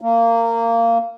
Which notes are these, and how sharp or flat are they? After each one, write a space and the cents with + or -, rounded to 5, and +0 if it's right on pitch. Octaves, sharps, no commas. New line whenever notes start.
A#3 -20